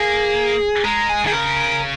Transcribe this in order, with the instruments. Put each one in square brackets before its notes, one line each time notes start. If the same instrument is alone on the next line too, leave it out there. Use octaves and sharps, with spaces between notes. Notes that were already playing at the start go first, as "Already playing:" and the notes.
Already playing: [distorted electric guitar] A#3 [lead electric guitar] G#4
[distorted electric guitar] G#3 [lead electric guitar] A#4
[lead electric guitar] G#4
[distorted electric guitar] D#3 [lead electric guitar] G#4
[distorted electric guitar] C#3 [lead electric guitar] A#4